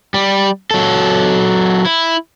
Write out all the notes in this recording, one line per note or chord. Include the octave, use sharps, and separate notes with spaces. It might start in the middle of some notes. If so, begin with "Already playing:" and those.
G3
F#3 A4
E4